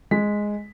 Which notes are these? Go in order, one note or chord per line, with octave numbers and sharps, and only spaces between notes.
G#3 B6